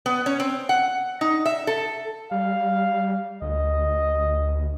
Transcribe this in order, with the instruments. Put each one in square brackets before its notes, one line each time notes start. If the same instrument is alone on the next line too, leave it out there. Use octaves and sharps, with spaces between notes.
[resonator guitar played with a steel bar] B3
C#4
C4
F#5
D#4
E5
A4
[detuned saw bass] G3 [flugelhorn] F5
[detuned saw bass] D2 [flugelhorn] D#5